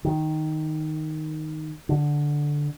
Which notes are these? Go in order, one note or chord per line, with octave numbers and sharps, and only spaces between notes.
D#3
D3